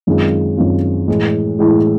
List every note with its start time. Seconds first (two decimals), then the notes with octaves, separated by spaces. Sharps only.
0.07 F#2 D#3 G#3 C4 F4
0.57 F#2 D#3 G#3 C4 F4
1.08 A2 E3 G#3
1.59 A2 E3 G#3